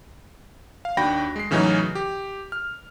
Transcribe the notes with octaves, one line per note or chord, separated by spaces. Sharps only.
F5
D#2 D4 F#4 G5 B5 A#6
G#3 C7
A2 C#3 E3 F#3 C#4 D#4
G4
F6